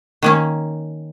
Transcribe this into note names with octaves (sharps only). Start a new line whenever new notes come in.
D#3 A#3 C#4